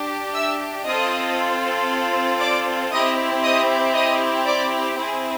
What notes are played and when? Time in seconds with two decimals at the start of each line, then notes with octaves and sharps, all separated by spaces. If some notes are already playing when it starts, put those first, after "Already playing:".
Already playing: D4 G4
0.35 E5 E6
0.86 C4 F4 A4 D#5 D#6
2.40 D5 D6
2.92 C4 E4 G4 D#5 D#6
3.43 D#5 D#6
3.94 D#5 D#6
4.46 D5 D6
4.97 C4 E4 G#4